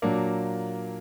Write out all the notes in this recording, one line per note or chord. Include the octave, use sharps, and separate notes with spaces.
A#2 F#3 A#3 D4